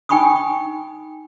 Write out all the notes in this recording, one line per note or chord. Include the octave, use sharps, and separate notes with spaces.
D#4 G5 G#5 B5 C#6 D#6